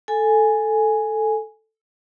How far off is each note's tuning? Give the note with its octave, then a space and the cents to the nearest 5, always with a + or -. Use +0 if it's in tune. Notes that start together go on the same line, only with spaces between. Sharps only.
A4 +0 G#5 +0